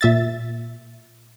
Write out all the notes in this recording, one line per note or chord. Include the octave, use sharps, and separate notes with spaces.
A#2 E5 A6